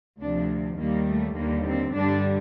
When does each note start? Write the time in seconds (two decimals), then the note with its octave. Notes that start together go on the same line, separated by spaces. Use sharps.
0.20 D2 C3 F3 D4
0.79 D#2 D#3 G3 A#3
1.07 A3
1.37 D#2 D3 G3 A#3
1.66 C4
1.94 G2 D3 G3 D4